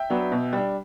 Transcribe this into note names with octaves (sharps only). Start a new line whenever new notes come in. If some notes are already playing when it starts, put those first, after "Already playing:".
Already playing: E5 G5
F#3 B3 D4
B2
G3 D4